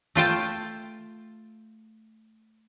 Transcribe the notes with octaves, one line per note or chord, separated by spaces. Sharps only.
A3 F4 G5 A5